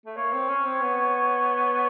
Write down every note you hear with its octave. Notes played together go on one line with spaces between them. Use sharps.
A3
A#3 C#5
C4
C#4
C4
B3